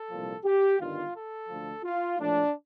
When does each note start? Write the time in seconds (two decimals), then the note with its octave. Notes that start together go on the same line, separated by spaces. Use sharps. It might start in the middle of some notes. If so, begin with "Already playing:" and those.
Already playing: A4
0.10 C2 A#2 F3
0.44 G4
0.79 G1 G2 D#3 F4
1.15 A4
1.49 D2 D3 F3
1.84 F4
2.19 A#1 A2 F3 D4